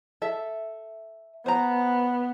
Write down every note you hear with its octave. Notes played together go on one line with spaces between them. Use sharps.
A4 E5
B3 C5 A#5